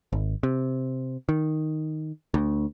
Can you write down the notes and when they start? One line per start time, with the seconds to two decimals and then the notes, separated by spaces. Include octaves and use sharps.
0.13 G#1
0.43 C3
1.29 D#3
2.34 D2